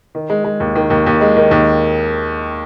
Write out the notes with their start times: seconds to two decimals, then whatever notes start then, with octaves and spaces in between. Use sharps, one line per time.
0.15 D#3
0.30 G#3
0.44 G#3
0.60 D#2
0.75 D#3
0.90 D#2
1.06 D#2
1.21 G#3
1.37 D#3
1.51 D#2